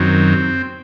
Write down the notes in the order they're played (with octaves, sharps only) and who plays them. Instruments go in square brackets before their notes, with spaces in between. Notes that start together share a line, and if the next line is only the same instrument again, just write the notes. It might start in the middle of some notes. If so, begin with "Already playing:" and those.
Already playing: [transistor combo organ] F#2 D#3 F#3 C4